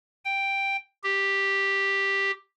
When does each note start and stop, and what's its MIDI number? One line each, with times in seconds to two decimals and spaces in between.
0.25 0.77 79
1.04 2.31 67